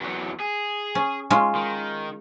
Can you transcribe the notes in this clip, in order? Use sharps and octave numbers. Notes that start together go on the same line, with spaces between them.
E2 F#3
G#4
C#4
G#3 C#4 F4
D#3